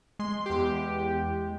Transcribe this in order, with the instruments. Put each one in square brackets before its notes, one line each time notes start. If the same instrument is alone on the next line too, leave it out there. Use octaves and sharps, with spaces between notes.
[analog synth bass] G#3 [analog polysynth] C6
[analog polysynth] E2 G4